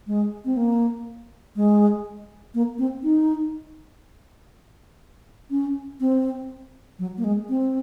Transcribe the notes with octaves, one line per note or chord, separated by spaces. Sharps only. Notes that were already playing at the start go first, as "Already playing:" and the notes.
G#3
C4
A#3
G#3
A#3
C4
D#4
C#4
C4
F#3
A#3
G#3
C4